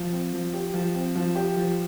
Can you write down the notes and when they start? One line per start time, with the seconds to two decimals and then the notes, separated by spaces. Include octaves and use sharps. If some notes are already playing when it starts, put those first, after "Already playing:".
Already playing: F3
0.12 C4
0.33 F3
0.54 G4
0.74 F3
0.95 C4
1.16 F3
1.36 G4
1.57 F3